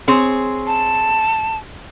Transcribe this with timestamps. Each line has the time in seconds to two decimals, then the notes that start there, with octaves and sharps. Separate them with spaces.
0.08 C4 G#4 C#5
0.67 A5